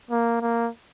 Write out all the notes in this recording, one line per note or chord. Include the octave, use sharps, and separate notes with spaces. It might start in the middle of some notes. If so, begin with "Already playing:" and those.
A#3
A#3